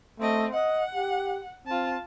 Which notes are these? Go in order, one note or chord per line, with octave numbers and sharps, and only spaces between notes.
A3 C4 D#5
D#5 F#5
G4
C4 F4 A5